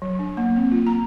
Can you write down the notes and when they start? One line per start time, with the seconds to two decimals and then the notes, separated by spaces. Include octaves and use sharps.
0.02 F#3
0.19 D4
0.37 A#3
0.56 C4
0.72 F4
0.86 A#5